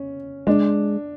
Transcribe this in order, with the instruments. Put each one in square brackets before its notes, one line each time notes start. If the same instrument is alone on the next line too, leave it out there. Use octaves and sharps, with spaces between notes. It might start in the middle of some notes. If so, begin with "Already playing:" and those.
Already playing: [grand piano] C#4
[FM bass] G#3 [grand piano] D4